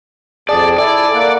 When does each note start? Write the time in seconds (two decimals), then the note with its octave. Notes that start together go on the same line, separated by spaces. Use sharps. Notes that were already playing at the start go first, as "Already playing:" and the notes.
0.49 F2 G#4 D5 A5
0.78 E4 A4 D5 G#5
1.15 A#3 F#5